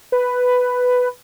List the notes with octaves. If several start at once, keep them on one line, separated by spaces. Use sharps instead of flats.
B4